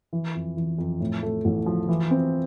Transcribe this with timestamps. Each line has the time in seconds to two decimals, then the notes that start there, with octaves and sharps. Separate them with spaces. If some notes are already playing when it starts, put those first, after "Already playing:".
0.13 E3
0.35 F2
0.57 E3
0.78 F2
1.00 A2
1.23 A3
1.45 A1
1.66 F3
1.89 E3
2.11 C4